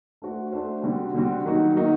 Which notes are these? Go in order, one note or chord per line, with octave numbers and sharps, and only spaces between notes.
A3 D4 F#4 C5
A3 D4 F#4 C5
D3 G3 C4 F#4
D3 G3 C4 F#4
D#3 F#3 A#3 D#4 F#4
D#3 F#3 A#3 D#4 F#4